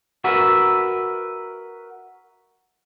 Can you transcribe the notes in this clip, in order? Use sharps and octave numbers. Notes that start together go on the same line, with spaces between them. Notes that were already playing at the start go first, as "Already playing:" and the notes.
F#4 A#4 B4 E5